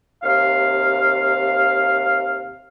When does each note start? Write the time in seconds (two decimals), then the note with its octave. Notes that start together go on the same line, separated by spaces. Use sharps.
0.23 D#2 C3 F5